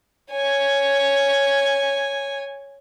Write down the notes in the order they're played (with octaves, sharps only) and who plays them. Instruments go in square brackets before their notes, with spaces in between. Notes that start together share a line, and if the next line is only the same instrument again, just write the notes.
[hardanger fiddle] C#5 G#5